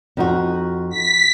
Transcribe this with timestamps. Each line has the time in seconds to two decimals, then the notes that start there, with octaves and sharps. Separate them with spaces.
0.17 F2 D#4 F#4
0.90 B6